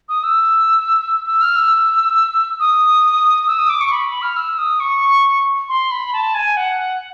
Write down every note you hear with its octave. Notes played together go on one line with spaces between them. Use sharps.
D#6
E6
E6
F6
E6
D#6
E6
D#6
D6
C#6
B5
B5
F6
E6
D#6
C#6
C6
B5
A5
G#5
F#5